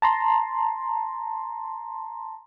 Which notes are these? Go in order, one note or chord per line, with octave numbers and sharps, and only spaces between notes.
A5 A#5 C6